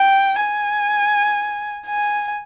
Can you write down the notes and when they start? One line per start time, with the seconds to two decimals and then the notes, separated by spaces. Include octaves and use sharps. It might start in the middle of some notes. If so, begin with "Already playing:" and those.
Already playing: G5
0.40 G#5
1.87 G#5